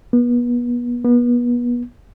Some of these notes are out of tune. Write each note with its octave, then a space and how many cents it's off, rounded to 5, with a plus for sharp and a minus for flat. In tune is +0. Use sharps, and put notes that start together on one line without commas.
B3 -30
B3 -30